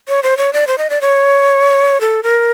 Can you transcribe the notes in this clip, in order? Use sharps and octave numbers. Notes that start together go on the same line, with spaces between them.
C#5
C5
C#5
D5
C5
D#5
D5
C#5
A4
A#4